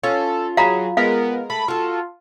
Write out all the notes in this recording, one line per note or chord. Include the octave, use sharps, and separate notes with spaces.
C#4 F4 A4
F#3 G#4 F5 A#5 B5
G#3 B3 A#4 F5
A3 B5
F4 F#4 A4